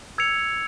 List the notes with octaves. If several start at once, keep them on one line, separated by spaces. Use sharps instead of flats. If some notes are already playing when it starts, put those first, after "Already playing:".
E6 G#6 C#7 F7